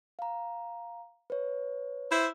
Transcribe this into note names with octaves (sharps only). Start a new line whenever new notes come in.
F5 A#5
B4 C#5
E4 C5 E5